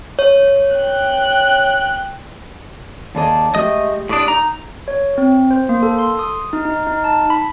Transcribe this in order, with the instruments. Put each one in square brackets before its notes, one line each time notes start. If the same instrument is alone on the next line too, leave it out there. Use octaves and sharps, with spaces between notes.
[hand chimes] C#5
[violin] G5 F#6
[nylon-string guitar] D#2 G#4 D#5 [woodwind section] D5 A5
[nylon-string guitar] G#3 G4 [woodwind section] A3 [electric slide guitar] D#5
[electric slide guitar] A2 D4 [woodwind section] D5 D6 D#6
[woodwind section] D#4 [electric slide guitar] A#5
[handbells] C#5
C4
C5
A#3
A4
C6
D#6
D#4
D#4
D#4
A5
B5